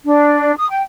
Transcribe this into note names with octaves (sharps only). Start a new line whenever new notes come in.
D4
D#6
G5